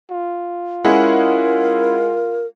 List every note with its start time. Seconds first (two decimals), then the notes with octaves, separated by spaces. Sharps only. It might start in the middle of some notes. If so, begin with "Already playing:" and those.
0.11 F4
0.85 G#3 C#4 E4 G#4 A#4 F#5